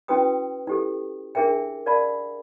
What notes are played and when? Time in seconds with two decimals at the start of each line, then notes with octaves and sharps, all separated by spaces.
0.08 C#4 E4 F#4 B4 G5 D#6
0.67 E4 G4 A4
1.35 D4 G#4 A#4 E5 G5
1.86 A#4 D5 F5 A5 B5